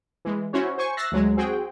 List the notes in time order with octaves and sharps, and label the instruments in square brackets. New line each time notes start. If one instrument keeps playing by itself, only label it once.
[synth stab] E3 G#3
C#4 E4 F#4 C5 C#5
C5 G#5 C#6
E5 E6 F#6 A6 A#6 C7
D2 F#3 G#3
C4 F#4 G#4 G5